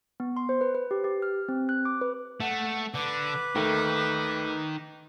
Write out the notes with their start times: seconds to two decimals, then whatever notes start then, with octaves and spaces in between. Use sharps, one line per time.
0.20 B3
0.37 C6
0.49 C5
0.61 B4
0.75 B4
0.91 G4
1.04 G4
1.22 F6
1.48 C4
1.69 F#6
1.85 D6
2.01 B4
2.40 A3 F#5
2.94 D3 B4 D6
3.55 D#2 D#3 A3